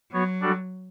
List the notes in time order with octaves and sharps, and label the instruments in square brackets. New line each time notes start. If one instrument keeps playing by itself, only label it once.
[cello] F#3 [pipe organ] B3 F#4 C#5
[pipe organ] G3 D4 F#4 A4 D5